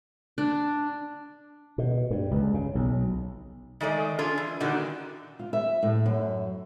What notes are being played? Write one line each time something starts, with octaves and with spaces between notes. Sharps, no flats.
D4
B2
G2
C#2
C#3
B1
D#3 G#3 A3 D5
D4 F4 G#4 A4
E3
A#2 D3 D#3 G3 D4 F#4
F4
E5
A2
F#2